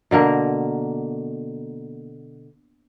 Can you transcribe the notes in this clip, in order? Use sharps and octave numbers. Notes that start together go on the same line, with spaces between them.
B2 D3 A#3 A#4